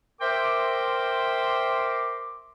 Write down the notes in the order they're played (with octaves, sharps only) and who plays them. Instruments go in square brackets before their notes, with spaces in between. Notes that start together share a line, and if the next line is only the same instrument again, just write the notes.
[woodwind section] A#4 C5 E5 G5 C6 D6